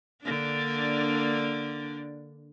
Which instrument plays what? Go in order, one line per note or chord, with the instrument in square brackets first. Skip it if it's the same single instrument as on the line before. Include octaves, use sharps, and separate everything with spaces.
[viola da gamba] D3 A#3 D4